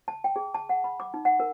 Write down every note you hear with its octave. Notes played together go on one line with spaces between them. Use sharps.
A5
G5
G#4
A5
F#5
B5
D6
D#4
F#5
A#4